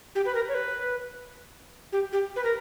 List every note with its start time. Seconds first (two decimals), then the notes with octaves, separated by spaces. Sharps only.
0.15 G4
0.25 B4
0.35 A#4
0.48 C#5
0.54 B4
1.92 G4
2.12 G4
2.36 B4
2.44 A#4